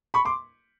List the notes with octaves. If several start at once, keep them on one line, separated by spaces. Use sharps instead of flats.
B5 C#6
C6 D6